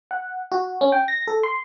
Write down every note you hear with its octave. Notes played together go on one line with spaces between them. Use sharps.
F#5
F#4
C#4
G5
A#6
A4
C6